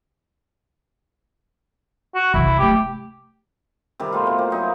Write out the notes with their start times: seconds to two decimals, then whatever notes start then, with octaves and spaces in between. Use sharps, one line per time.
2.15 F#4
2.34 C2 D#3 E4
2.59 F#3 A3 G4
4.00 C3 D#3 G3 G4
4.12 B2 A3 C4 F4
4.27 C4 F4
4.39 A#3
4.50 F#3 D#4 E4